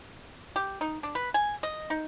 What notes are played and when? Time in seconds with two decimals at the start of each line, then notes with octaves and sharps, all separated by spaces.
0.56 G4
0.81 D#4
1.03 D4
1.15 B4
1.34 G#5
1.63 D#5
1.90 D#4